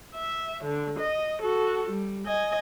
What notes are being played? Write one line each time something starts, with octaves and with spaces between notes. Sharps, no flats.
E5
D3
D#5
F#4 A4
G3
D#5 G#5